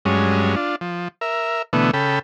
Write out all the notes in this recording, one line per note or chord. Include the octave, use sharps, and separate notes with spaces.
G2 F#3 G#3 C#4
D4 F4
F3
A#4 E5
B2 D3 E3 A3 B3
C#3 A4 G5 B5